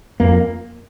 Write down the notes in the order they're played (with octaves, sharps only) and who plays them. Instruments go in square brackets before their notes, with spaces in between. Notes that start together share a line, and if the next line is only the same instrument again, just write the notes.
[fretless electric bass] F2 A#3